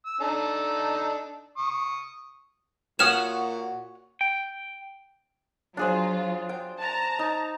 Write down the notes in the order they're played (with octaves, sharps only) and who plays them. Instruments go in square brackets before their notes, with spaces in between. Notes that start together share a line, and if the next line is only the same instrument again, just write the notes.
[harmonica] E6
D4 D#4 A4
C#6 D#6
[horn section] A#2 F#4 [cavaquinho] C#5 F#5 D#6 [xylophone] F6 E7
[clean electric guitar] G5
[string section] F#3 F4 [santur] D4 G#4 C5
[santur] G5
[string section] A5 A#5
[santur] D#4